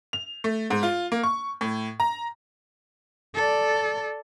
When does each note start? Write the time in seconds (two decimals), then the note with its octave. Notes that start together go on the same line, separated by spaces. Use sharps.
0.13 F7
0.44 A3
0.70 G#2
0.83 F4
1.12 A#3
1.23 C#6
1.61 A2
2.00 A#5
3.35 A4 D5